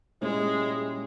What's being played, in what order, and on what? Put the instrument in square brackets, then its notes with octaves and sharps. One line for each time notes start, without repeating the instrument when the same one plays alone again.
[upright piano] A#2 G3 C#4 E4 [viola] G#3